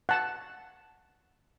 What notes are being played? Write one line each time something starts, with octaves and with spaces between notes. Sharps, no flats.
F#5 A5